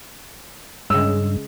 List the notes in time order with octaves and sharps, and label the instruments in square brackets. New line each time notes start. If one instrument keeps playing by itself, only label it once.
[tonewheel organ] G2 [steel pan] C#3 G#3 [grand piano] E6